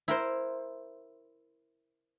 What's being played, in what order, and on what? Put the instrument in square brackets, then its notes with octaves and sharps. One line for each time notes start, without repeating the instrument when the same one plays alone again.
[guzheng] E4 A#4 C5